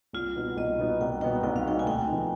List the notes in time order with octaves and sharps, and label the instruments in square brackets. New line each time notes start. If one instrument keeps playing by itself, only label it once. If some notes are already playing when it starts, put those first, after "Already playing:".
[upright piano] C2 [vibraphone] F4
[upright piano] B2 B3 D#4
[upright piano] C2 [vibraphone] D#5
[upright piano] B2 B3 D#4
[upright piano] C2 [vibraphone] G5
[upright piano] B2 B3 D#4 [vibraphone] G5
[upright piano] C2 [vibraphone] G5
[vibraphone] F5
[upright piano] B2 B3 D#4 [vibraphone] G5
[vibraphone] G#5
[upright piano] D2 [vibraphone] G5
[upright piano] C3 F3 B3 D#4